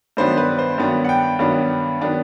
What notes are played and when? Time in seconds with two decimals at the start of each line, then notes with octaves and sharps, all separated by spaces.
0.17 G2 D#3 F#3 B3 D4 C5
0.37 B4
0.59 C5
0.78 G2 D#3 F#3 B3 D4
1.04 F#5
1.09 G5
1.39 G2 D#3 F#3 B3 D4
2.01 D#3 F#3 B3 D4